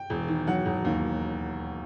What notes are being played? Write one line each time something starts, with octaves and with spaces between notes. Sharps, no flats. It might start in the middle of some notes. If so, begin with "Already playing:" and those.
Already playing: G5
E1
D#3
F#3 F#5
E1
D#2